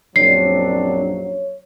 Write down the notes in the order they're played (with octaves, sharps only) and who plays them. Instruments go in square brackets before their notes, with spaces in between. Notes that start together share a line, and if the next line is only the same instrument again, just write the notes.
[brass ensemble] A#1 F#2 F#3 [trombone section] C4 D4 [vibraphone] C#5 [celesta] C7